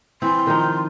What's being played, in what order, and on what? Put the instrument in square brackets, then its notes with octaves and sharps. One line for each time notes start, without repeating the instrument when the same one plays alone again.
[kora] E3 C4 [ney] C6
[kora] D#3 F3 D#4